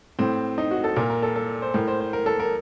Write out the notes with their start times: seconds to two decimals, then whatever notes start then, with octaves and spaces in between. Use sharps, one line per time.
0.19 A2 C4
0.58 D#4
0.71 F#4
0.84 A4
0.96 A#2 A#4
1.10 A#4
1.23 A4
1.36 A4
1.62 C5
1.74 A2 A#4
1.88 C5
2.00 C5
2.13 A#4
2.26 A4
2.39 A#4